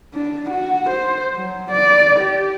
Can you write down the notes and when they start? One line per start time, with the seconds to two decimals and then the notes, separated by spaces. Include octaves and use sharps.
0.14 D4
0.50 F#4
0.90 C5
1.35 F#3
1.71 D5
2.19 G4